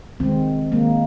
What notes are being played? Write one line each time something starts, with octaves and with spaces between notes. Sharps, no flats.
D#3 G#3 C4
D#3 G#3 A#3